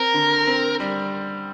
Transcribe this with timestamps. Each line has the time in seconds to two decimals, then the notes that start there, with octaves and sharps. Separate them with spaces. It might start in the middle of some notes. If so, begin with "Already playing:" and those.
Already playing: C4 A#4
0.14 D3
0.47 C4
0.80 G3